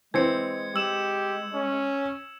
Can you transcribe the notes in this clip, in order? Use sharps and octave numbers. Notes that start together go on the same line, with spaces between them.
E3 G#3 C4 G#6 C#7
G#3 G4 E6 E7
C#4